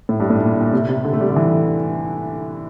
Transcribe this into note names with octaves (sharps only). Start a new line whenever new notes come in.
A2
G2
A2
A#2
A#2
C3
C3
D3
A3
G3
D3
E3